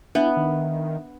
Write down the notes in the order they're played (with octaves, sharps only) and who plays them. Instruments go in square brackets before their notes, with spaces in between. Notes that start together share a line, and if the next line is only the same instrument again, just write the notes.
[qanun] B3 [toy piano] D4 [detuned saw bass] E4 [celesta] E5
[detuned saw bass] D#3